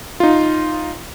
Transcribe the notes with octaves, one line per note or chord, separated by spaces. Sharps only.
D#4 F4